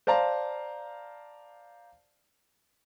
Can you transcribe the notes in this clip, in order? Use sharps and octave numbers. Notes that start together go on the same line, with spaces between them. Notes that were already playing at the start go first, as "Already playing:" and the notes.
C5 D5 F5 A5 A#5